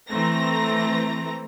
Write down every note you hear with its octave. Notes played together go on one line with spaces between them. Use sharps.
E3 A3 C4 A#5 A#6